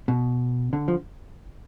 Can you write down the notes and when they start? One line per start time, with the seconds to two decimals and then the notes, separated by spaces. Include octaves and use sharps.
0.08 B2
0.73 D3
0.88 F3